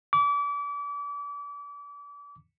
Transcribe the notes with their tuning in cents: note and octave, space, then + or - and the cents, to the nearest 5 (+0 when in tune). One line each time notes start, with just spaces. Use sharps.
D6 -35